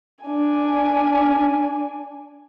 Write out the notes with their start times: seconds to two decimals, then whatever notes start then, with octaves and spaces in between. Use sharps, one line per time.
0.25 D4 G#5